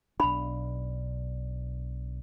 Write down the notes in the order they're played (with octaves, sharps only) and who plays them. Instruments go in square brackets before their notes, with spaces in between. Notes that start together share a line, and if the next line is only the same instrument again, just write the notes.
[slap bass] B1 D4 [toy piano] B5